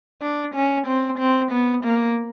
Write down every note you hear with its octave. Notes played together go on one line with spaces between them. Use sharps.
D4
C#4
C4
C4
B3
A#3